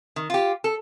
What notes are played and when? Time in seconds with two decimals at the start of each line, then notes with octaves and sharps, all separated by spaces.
0.16 D#3
0.30 F4 G4
0.64 A4